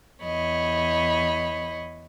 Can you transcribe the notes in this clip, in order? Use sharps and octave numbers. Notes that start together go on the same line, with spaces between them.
E2 C#5 D#5 B5